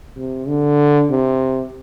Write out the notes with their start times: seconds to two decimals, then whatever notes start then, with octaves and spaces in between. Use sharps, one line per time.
0.17 C3
0.48 D3
1.10 C3